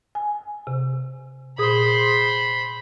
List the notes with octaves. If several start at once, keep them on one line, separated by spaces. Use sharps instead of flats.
G#5
C3
A#2 G#4 C5 B5 D#6